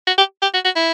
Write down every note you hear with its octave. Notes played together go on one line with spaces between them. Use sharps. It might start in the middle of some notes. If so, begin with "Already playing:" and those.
F#4
G4
G4
F#4
F#4
E4